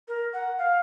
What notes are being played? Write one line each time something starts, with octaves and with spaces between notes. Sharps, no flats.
A#4
F#5
F5